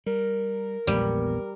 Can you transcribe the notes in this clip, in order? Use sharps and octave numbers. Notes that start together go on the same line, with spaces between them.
G3 A#4
A#1 E2 A#2 F3 G3 G#3 B3